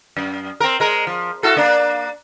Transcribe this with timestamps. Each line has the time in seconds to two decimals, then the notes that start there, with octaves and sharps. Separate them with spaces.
0.17 F#2
0.60 C4 A#4
0.80 G#3 A#4
1.07 F3
1.43 E4 F#4 A4
1.57 A#3 D4